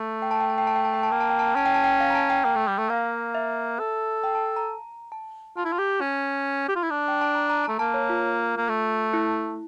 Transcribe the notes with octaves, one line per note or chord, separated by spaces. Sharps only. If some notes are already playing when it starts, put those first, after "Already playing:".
Already playing: A3
G5
A5
G5
A5
G5
A5
G5
A5
G5
A5
A#3 G5
A5
G5
A5
G5
C#4 A5
G5
A5
G5
F5
A#5
A5
G5
A#3 G5
A3
G3
A3
A#3 F5
E5
A4
G5
A5
A5
A#5
A5
F4 A5
E4
F4
G4
C#4
G4
F4
E4
D4
G5
A5
A#5
A#5
A3 A5
A#3 A5
C#5
F4
A#3
A3
E4